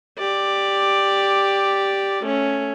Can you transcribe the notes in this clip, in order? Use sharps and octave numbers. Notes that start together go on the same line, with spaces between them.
G4 D5
A3 C#4